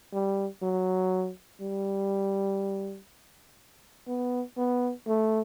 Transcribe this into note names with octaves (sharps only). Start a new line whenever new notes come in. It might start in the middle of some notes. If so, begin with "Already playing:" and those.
G3
F#3
G3
B3
B3
A3